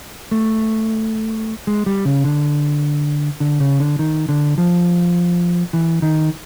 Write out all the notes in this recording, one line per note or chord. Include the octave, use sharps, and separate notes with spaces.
A3
G#3
G3
C#3
D3
D3
C#3
D3
D#3
D3
F3
E3
D#3